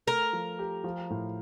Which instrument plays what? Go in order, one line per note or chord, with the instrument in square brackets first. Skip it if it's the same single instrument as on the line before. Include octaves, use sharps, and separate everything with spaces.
[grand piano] A3 [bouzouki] A#4
[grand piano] F3
G4
F3
A2